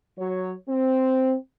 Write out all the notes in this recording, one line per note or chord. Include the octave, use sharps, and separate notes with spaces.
F#3 C#5
C4